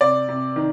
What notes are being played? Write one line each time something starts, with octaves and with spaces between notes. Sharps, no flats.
C3 D5
C3
D#3